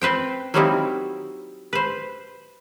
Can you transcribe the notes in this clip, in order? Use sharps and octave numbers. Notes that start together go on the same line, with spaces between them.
C4 B4 C5 G5
F#3 G3 A#3 C4 D#4 E4
B4 C5